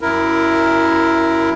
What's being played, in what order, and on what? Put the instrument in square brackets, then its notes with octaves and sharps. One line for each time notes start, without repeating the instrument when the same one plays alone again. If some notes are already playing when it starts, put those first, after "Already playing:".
[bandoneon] F#2 E4 A#4